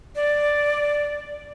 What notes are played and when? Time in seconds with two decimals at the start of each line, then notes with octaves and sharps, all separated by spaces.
0.15 D5